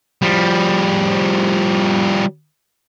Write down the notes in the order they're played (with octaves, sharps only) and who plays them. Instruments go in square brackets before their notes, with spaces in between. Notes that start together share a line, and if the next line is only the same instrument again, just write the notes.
[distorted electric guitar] F3 G3